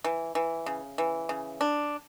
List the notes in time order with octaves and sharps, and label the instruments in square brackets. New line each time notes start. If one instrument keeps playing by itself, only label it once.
[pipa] E3
E3
C#3
E3
C#3
D4